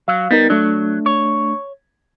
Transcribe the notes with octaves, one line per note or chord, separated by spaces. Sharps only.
F#3 F5
G3 B3 D#4 A#4
F#3 A3 D4
C#5